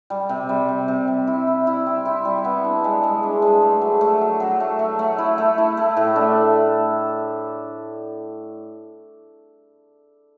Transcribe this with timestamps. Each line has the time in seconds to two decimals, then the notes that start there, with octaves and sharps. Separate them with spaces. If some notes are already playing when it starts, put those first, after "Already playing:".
0.10 G3
0.29 C3
0.49 G3
0.69 C3
0.88 C3
1.08 G3
1.27 E4
1.47 E4
1.67 E4
1.87 C4
2.05 E4
2.25 G3
2.45 B3
2.64 D4
2.84 G#3
3.03 G#3
3.23 D4
3.42 G#3
3.62 A3
3.82 F#3
4.01 A3
4.21 F#3
4.40 F#3
4.60 A3
4.79 A3
4.99 A3
5.18 E4
5.38 A3
5.58 E4
5.77 A3
5.97 A2
6.16 D4